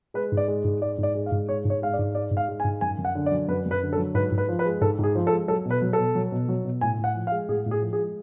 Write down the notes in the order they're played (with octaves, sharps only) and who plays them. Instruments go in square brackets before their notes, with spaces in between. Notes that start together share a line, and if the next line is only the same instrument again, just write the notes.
[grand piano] G#3 B4
G#2
D5
G#3
G#2
G#3 D5
G#2 D5
G#3
F5
G#2
G#3 C#5
G#2 C#5
G#3 F5
D5
G#2
G#3 D5
G#2
F5
G#3
G#5
G#2
F#2 G#5
F#2
F#5
D3
D5
F#3
F#2 B4
F#2
B4
D3
A4
F#3
G#2 B4
G#2
B4
F3
B4
G#3
G#2 A4
G#2 G#4
F3
A4
G#3
F#3 A4
B2
B4
F#3
B2 A4
F#3
B2
F#3
B2
A2 G#5
A2
F#5
F3
F5
G#3
A2 G#4
A2
G#4
F3
G#4
G#3